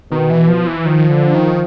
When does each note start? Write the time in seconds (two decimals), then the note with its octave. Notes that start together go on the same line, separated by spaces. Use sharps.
0.11 B2 D#3
0.30 E3
0.48 F3
0.67 E3
0.85 D#3 F3
1.10 D3
1.34 D#3